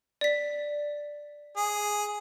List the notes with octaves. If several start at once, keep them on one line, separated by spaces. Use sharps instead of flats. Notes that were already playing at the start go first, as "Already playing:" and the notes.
D5 B6
G#4